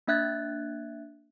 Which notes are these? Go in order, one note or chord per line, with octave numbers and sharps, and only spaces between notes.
A#3 D4 E5 F#6 G#6 A6